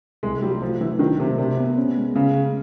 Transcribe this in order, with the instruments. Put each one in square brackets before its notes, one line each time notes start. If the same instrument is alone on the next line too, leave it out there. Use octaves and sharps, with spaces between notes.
[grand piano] C2 [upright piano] G#3
[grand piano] F#3 [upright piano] G3
[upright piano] F3 [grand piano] A3
[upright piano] E3 [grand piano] F#3
[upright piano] D#3 [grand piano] D4
[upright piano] C3 [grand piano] A#3
[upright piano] C3 [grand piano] D4
[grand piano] B3
C#4
G#3
[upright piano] C#3 [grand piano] C#4
[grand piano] G#3